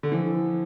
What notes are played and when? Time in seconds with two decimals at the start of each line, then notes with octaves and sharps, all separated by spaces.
0.03 D3
0.12 E3 F3